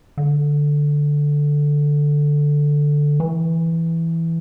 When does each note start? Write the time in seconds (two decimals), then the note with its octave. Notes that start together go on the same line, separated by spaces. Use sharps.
0.17 D3
3.20 E3